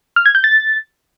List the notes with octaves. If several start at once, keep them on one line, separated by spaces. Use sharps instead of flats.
F6
G#6
G6
A6